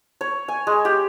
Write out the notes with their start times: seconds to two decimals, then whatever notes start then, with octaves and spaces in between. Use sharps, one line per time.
0.21 C#5
0.48 G#5
0.67 G#3
0.85 G4